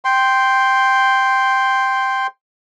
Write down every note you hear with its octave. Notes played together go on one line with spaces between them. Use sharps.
G5 C6